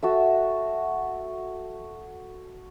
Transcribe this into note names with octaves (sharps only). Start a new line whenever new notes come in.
F#4 A4 E5